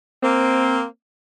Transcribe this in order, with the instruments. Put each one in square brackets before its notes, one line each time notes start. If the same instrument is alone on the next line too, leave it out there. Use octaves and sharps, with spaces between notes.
[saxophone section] A#3 C4